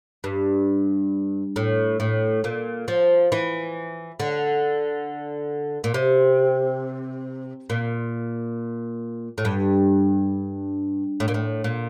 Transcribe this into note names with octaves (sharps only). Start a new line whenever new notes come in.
G2
A2
A2
A#2
F3
E3
D3
A#2
C3
A#2
A2
G2
A2
A#2
A2
A#2